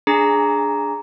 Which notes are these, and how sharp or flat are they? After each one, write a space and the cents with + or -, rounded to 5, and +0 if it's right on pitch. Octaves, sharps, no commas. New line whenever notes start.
D4 +0 G#4 +0 A#5 +0